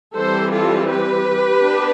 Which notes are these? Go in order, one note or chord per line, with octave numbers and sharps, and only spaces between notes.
E3 G3 C4 A4 C5
F4 A4
G4 B4
B3 D4